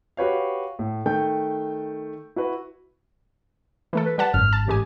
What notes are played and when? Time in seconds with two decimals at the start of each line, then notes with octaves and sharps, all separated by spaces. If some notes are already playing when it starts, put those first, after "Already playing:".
0.17 F#4 G4 B4 C#5 F5
0.79 A2
1.06 D#3 A3 G5 G6
2.36 E4 F#4 B4
3.93 E3 A3 A4
4.05 B4
4.18 G3 B4 F#5 A5
4.34 G#1 F#2 F6
4.53 A5
4.68 A1 G#3 G4 G#5